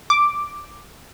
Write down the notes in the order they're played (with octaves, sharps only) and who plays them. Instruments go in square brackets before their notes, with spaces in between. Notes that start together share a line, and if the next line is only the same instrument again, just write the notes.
[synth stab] D6